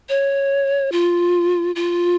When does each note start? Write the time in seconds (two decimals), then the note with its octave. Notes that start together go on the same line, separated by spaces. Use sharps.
0.09 C#5
0.92 F4
1.76 F4